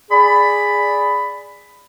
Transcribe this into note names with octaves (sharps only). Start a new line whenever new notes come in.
G#4 D5 B5